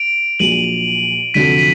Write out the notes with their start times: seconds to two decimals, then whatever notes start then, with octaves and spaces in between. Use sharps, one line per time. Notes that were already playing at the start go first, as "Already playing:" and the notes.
Already playing: D7 F7
0.39 A#1 A#2 F#3 D#7 F#7
1.34 F1 F2 D3 F#3 B6 D#7
1.58 B6 D#7